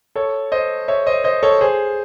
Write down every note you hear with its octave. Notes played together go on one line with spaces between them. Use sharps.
A4 C#5
C5 D#5
C#5 E5
C5 D#5
C5 D#5
A4 C#5
G#4 C5